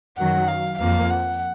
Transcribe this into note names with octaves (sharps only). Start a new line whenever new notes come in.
F#2 D#3 F#3 F#5
F5
F2 F3 A#3 F5
F#5